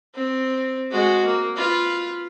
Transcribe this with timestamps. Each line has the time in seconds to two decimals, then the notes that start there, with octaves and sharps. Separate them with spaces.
0.15 C4
0.91 G#3 F#4
1.25 A#3
1.56 F4 B4